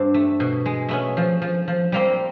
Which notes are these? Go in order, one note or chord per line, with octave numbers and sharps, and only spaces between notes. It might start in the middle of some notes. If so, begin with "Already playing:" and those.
Already playing: G2 C4 D4
A3
B2
G#3
A3 B3 C#4
F3
F3
F3
G3 A#3 C4